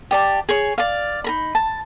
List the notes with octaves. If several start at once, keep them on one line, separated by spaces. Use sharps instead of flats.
G4 D5 A5
G#4 C#5
D5 F5
D#4 A#4 B5
A5